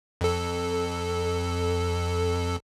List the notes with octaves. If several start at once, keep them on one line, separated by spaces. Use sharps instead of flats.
F2 A4